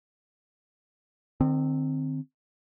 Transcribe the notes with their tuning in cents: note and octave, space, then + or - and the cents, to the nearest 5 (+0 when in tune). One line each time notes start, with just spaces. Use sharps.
D#3 -40 C4 +0